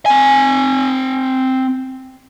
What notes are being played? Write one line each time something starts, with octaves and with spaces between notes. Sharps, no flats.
C4 G#5